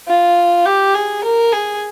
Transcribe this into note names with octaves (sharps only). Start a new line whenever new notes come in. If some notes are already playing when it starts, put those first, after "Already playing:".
F4
G4
G#4
A#4
G#4